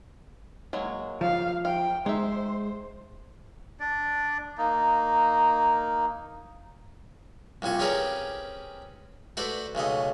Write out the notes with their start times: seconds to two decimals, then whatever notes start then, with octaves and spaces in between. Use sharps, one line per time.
0.73 F#3 G#3 A#3
1.21 F3 F5
1.65 F5 G5
2.06 G#3 D#4 C5 E5
3.80 D4 D5
4.58 A#3 D#4
7.62 C2 A#2 G3 G#5 C#6
7.79 C4 C#4 G4 G#4 A#4 B4
9.37 A3 F#4 B4 C5 D5
9.75 B1 C#3 A3 D#5